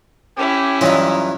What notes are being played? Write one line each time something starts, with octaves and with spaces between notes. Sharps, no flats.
C#4 E4 G4
G2 E3 F#3 F4 D#5 A#5